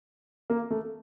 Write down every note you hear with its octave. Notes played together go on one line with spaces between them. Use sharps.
A#3
A3